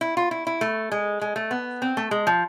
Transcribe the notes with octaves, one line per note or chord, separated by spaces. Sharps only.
E4
F4
E4
E4
A3
G#3
G#3
A3
B3
C4
A3
G#3
F3